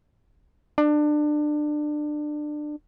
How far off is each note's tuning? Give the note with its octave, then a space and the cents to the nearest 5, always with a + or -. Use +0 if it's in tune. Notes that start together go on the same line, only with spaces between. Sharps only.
D4 +25